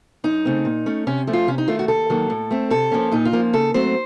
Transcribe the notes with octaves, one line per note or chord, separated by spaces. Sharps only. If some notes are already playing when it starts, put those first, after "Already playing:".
F#2 D#4
C#3 A3 C4
A#2
A3 C#4
C3 C#4
F3 A3 C#4
F4
C3 C#4
D#4
D#3 A3 F4
F#4
D#2 A4
D#3 F#3 A#3
A2
A3 C4
C3 A4
F3 A#3 C#4
A#2 D#4
F4
F3 A#3 C#4
C#3 A4
F#3 A3 C4 C5